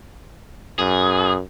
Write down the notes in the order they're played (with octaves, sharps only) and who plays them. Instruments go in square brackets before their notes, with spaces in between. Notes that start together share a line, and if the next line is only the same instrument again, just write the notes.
[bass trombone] F#2 [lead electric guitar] G#4